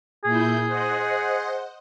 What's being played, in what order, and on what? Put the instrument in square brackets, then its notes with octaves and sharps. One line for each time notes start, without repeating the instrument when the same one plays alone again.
[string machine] A#2 E4 G6 [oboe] G#4
[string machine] C5 D#5 F#5